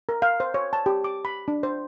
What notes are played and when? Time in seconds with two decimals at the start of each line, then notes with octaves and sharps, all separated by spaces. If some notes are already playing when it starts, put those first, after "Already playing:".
0.09 A#4
0.22 F5
0.40 C5
0.54 C#5
0.73 A5
0.86 G4
1.04 D6
1.25 B5
1.48 D4
1.63 C5